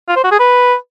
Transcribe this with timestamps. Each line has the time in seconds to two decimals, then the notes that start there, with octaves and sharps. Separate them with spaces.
0.08 F4
0.16 C5
0.24 F#4
0.32 G#4
0.39 B4